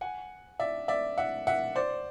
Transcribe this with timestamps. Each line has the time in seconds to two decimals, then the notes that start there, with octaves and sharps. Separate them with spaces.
0.01 F#5 G#5
0.60 D5 E5
0.88 D5 E5
1.18 E5 F#5
1.47 E5 F#5
1.76 C5 D5